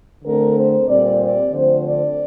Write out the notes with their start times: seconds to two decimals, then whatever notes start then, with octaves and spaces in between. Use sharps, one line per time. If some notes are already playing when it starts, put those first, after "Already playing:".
0.24 D3 A3 C4 A#4
0.57 C5
0.88 A#2 G3 C4 D5
1.20 D5
1.53 D3 F3 A3 C4 C5
1.86 D5